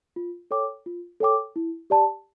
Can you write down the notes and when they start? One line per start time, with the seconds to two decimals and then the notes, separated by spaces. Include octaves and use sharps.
0.16 F4
0.51 A4 C#5 G5 D6
0.86 F4
1.20 A4 C#5 G5 D6
1.56 E4
1.90 G4 D5 A5